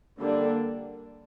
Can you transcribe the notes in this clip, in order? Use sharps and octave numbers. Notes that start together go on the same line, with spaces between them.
D3 G3 A#3 D4